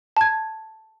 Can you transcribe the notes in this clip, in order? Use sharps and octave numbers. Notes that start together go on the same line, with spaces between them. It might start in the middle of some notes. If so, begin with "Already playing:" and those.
A5 G#6